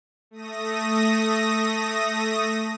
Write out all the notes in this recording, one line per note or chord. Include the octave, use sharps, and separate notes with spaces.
A3 D#6 A#6